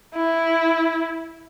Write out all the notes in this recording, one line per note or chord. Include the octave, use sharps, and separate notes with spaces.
E4